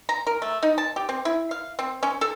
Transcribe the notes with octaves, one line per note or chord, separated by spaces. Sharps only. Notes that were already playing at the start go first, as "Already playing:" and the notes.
A#5
A#4
A3
D#4
A5
G4
C4
E4
F5
C4
C#4
A4